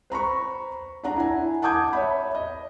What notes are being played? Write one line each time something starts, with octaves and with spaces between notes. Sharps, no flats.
C5 A#5 B5 C#6
D4 F#5 A#5
E4 G#5
F#5 A5 D6 D#6 G6 G#6
C#5 E5 B5
D#5